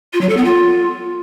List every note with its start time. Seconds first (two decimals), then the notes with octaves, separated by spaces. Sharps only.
0.13 F4
0.21 F#3
0.29 A4
0.37 B3
0.45 F4